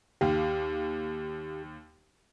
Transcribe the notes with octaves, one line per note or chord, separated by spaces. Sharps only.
D#2 G4 F5